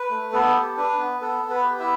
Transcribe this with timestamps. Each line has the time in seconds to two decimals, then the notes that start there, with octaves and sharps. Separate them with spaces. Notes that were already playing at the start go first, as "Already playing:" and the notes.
Already playing: B4
0.10 A3
0.33 B3 A4
0.55 G4
0.77 D4 B4
0.98 B3
1.21 B3 A4
1.43 B3
1.50 B4
1.64 G4
1.80 E4 E5